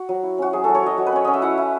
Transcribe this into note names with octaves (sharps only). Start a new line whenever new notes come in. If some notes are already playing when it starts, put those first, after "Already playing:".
Already playing: F#4
F#3
E4
C#4 F#4
F#3 G#4
F#3 A4
C#5
F#3 D#5
F#3
B4
C#4 C#5
C#4 D#5
E5
E4 F#5
E4